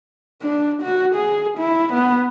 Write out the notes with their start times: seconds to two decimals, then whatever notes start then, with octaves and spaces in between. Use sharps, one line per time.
0.42 D4
0.83 F#4
1.15 G#4
1.58 E4
1.93 B3